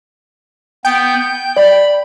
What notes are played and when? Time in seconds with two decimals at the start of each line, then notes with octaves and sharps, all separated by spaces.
0.85 B3 G5 G6
1.20 G6
1.57 D5 B5